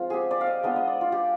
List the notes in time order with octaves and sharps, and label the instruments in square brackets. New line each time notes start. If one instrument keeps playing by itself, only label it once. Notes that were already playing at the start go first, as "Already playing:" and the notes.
Already playing: [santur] F3 G#3 C4 F4
G4 G#4
D5
F5
D#5
G#3 B3 D4 F4 D#5
D#5
D5
F4
G4